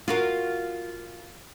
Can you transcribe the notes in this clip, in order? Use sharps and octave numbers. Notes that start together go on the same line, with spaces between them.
F4 F#4 A#4